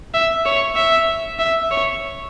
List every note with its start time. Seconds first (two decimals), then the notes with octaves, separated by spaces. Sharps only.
0.14 E5
0.46 C#5
0.76 E5
1.39 E5
1.71 C#5